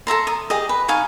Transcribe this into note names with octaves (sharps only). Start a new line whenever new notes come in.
A4 E5 A#5 C6
D#6
G4 G#4 D#5
B4
D#4 F5 G#5 C#6